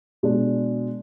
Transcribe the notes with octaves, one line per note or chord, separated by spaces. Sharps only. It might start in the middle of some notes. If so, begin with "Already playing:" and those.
B2 G#3 D4